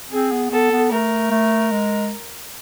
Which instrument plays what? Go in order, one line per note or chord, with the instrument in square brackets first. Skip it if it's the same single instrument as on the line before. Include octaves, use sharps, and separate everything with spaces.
[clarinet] C4 [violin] G#4
[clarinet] B3
[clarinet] B3 [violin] A4
[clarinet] B3
[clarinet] A3 [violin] A#4
[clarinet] A3
G#3